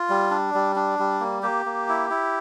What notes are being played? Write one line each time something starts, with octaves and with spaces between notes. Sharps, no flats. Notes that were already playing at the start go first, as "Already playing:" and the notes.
Already playing: F4
G3
D4
G3
D4
G3
A#3
A#3 G4
A#3
E4
E4